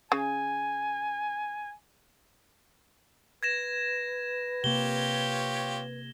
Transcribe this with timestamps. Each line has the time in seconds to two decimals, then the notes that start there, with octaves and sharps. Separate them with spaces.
0.12 C#3 G#5
3.43 B4 G#6 A#6 E7
4.64 C3 A#3 F4 G4 C#5 G7